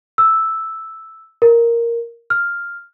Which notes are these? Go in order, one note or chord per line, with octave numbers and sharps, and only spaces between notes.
E6
A#4
F6